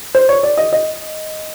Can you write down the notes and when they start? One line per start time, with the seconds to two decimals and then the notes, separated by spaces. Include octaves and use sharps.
0.15 C5
0.29 C#5
0.43 D5
0.57 D#5
0.73 D#5